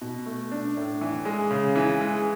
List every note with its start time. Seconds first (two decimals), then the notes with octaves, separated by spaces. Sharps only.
0.01 B2
0.26 A3
0.52 D4
0.77 A2
1.01 E3
1.25 G#3
1.51 C#3
1.76 E3
2.01 G#3